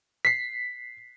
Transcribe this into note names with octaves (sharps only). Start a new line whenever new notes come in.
B6 C7